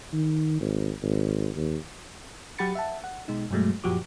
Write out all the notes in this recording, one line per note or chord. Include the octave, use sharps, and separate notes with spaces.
D#3
G#1
G#1
D#2
F#3 G4 F#5 B5 A6 C#7
E5 F#5 A5
F#5
B2 G#3 D#4
G2 B2 F#3 G#3 A3
F#2 A#2 F3 F#4 G4 D6